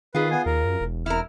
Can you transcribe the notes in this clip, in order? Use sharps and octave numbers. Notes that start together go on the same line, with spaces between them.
D#3 F4 G#4 B4
B3 G#5
D#2 A#4
F#2
E1
E1 E4 A#4 F6